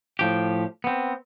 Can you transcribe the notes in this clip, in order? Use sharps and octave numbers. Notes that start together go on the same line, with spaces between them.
A2 F3 G4
B3 C4